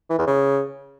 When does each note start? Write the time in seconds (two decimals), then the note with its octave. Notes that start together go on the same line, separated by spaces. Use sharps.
0.10 E3
0.19 E2
0.27 C#3